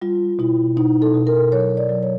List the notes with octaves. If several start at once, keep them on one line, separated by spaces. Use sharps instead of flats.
G3 F4
B2 E4
B2 D#4
A4
B2
A#4
F#3 C#5
D5
F#3
C#5